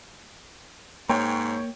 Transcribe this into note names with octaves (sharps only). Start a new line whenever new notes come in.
G#2 A#3 C#5 G5